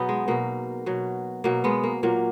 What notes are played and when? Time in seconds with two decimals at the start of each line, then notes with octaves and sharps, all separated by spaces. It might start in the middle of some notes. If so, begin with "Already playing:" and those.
Already playing: B2 F#3 B3 D#4 G#4 B4
0.09 G#3
0.28 B2 F#3 A#3
0.86 B2 F#3
1.44 B2 F#3 A#3
1.64 G#3 B3
1.84 A#3
2.03 A#2 F#3 A#3